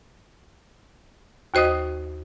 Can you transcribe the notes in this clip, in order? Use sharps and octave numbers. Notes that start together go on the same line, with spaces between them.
D#2 F#4 C5 D#5 D#6